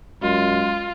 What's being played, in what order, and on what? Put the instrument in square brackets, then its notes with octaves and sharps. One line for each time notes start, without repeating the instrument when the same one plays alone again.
[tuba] F#2 [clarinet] G#3 [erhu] F4